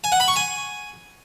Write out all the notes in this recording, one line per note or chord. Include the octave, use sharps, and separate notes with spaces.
G#5
F#5
B5
C#6
G#5